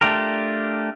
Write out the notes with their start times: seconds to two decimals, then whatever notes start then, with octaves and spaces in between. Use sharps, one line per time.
0.01 A3 D4 F4 G4 A#4